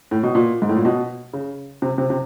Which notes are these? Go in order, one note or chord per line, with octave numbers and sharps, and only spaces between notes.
A2
B2
A#2
G#2
A2
A#2
B2
C#3
C3
C3
C3